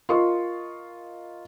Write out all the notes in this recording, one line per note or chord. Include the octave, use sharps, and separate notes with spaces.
F4 A#4 D#5 C6 C#6